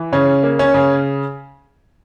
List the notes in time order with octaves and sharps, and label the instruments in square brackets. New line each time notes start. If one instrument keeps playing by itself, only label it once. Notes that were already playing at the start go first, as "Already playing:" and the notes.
Already playing: [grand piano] E3
C#3 C#4
A#3
C#4
C#3